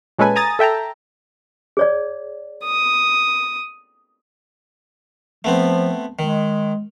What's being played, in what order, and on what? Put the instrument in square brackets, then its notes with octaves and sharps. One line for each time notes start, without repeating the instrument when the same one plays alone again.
[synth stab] A#2 G#3 C#4 A4 B4 G#5
G#5 A#5 D#6 A6
A4 E5 G5 A5 A#5
[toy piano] G#4 C#5 D5
[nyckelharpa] D#6
[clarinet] F3 [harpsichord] A3 B3 C4
[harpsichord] D#3 [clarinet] G#3